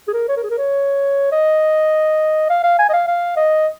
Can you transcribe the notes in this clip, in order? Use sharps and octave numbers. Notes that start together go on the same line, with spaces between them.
G#4
A#4
C#5
A#4
G#4
A#4
C#5
D#5
F5
F5
G#5
D#5
F5
F5
D#5